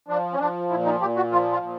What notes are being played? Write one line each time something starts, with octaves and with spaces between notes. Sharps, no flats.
F3 D4
C#4
F3 D4
A#2 E4
D#4
A#2 G4
F#4
F3 F4
F4
A#2